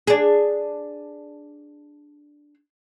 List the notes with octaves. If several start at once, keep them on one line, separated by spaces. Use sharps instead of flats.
D4 G#4